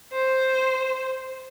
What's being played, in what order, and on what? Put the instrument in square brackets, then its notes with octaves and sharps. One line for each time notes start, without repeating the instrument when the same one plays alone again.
[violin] C5